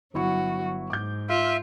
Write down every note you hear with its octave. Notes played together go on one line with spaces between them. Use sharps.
G1 F#3 E4 F#4 C#6
G#2 D6 G6
F4 E5